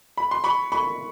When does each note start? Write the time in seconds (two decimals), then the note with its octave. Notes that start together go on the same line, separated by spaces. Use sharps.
0.17 B5
0.31 C6
0.44 B5 C#6
0.72 B5 C#6